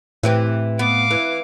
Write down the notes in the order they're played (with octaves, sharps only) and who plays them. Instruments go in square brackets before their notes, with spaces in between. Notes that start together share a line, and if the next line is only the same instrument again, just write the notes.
[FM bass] A2 [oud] E3 C4 G4
[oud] B3 [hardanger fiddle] F5 D6
[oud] E3